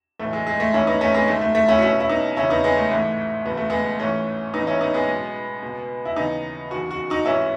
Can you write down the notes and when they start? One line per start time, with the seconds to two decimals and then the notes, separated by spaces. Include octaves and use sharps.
0.19 B1 A2 E3 A3
0.33 G#3
0.47 G#3
0.60 A3
0.74 A1 G#2 D#3 C#4 E4
0.87 B3 D#4
1.01 A3 C#4
1.14 G#3 B3
1.28 F#1 F#2 D#3 A3
1.41 A3
1.55 A3
1.68 C#4 E4
1.78 F#4
1.82 B1 B2 C#4 E4
2.00 E4
2.09 B3 D#4
2.37 E1 D#2 C#3 C#4 E4
2.50 B3 D#4
2.64 G#3 B3
2.77 A3
2.91 A1 G#2 E3 A3
3.45 F#1 E2 B2 B3
3.57 A3
3.70 G#3 B3
3.99 A1 G#2 E3 A3 C#4
4.54 A1 G#2 E3 B3 D#4
4.67 C#4 E4
4.81 B3 D#4
4.94 G#3 B3
5.08 B1 B2
5.62 C#2 B2
6.05 E4
6.16 D#2 C#3 E3 B3 D#4
6.71 F#1 E2 D#3 F#4
6.91 F#4
7.10 D#4 F#4
7.25 A1 G#2 E3 C#4 E4